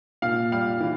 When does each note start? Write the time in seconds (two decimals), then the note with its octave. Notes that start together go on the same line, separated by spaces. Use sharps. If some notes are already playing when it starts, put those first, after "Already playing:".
0.22 A#2 F5
0.52 G3 F5
0.81 E3